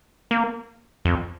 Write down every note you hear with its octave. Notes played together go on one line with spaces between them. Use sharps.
A#3
F2